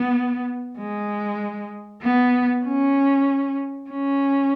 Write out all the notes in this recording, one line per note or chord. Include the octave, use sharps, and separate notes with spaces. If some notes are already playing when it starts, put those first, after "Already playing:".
Already playing: B3
G#3
B3
C#4
C#4